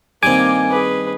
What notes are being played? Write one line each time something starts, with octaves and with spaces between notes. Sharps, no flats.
G2 D#3 A#3 C4 G#5 D6
G#4 B4